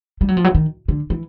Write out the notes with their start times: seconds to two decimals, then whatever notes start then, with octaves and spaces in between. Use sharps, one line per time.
0.21 G3
0.28 F#3
0.37 F3
0.44 F#3
0.55 D#3
0.88 D3
1.10 E3